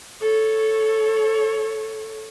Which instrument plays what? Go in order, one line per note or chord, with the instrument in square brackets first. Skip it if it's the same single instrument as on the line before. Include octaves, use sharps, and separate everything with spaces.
[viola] A4 C#5